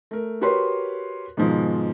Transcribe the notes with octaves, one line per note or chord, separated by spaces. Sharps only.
A3 A#4
F#4 G4 A#4 B4 C#5 C6
G#2 B2 D#3 F3 G#3